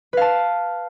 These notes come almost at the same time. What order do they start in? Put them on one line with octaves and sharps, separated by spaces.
B4 F5 A5